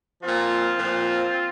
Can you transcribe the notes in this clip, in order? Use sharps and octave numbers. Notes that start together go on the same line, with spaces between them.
A#2 F3 C4 F4
A#2 F3